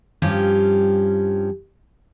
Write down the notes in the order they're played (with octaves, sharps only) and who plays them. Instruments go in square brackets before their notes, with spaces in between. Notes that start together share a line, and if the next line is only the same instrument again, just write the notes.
[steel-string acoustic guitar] G2 F3 C#4 G4